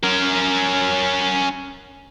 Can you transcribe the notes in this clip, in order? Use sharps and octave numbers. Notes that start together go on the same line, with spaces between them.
C#4 A#4